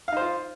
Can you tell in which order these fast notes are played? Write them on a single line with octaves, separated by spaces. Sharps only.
F5 D#4 C5 F4